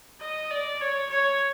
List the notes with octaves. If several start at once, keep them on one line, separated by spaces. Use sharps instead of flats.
D#5
D5
C#5
C#5